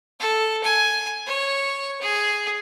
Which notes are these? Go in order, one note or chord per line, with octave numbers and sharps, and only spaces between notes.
A4
G#5
C#5
G#4